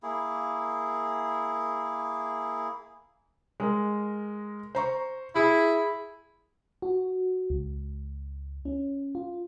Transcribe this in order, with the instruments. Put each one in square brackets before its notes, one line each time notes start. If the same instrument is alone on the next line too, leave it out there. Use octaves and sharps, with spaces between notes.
[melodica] A#3 E4 G#4
[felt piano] G#3 A#4
C5 A#5 C#6
[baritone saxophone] E4 [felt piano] G#4
[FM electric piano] F#4
C#2
C#4
F4